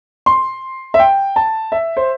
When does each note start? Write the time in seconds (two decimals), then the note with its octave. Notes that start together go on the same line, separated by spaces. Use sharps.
0.26 C6
0.94 E5
0.99 G5
1.36 A5
1.72 E5
1.97 C5